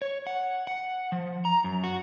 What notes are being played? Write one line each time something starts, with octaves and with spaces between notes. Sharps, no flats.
C#5
F#5
F#5
F3
A#5
F#2
F#4